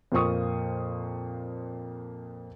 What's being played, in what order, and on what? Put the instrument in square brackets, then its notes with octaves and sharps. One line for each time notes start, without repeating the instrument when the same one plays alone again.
[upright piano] F2 A#2 F4 C5 C#6 D#6